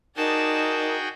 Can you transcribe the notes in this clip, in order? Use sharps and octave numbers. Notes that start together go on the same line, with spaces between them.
D#4 F#4 G#4 A#4 D5 G5 A5